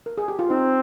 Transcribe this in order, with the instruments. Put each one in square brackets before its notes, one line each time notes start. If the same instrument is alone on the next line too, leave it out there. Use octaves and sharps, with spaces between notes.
[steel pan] A#4
G#4
G4
F4
[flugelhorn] C4 [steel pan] D#4